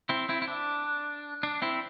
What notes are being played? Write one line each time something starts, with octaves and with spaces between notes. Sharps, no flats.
C4 E4
C4 E4
E4
D4
D4
C4 E4